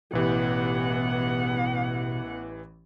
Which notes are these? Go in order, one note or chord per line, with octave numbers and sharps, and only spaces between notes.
A1 B2 E3 B3 G4 F#5